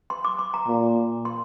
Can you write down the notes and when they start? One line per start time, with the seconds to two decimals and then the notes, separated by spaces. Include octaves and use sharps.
0.10 C6
0.24 D6
0.39 C6
0.54 A#5
0.68 A#2
1.25 C6